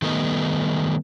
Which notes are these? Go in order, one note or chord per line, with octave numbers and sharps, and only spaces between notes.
D#3 G3 A3 B3 D#4